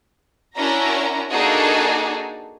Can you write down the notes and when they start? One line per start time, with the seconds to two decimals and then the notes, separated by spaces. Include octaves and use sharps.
0.57 C#4 D4 E4 F#4 A#4 A#5
1.31 A#3 D4 D#4 F#4 G#4 A4